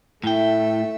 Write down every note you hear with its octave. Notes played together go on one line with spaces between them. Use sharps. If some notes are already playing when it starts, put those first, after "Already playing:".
A2 A3 E4 E5 G5